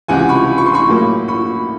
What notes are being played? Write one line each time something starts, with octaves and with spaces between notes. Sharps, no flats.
C#2 C3 E3 F#5 G#5
B5 C#6
C#6
C6
B5 C#6
A2 F#3 A#3
B5 C#6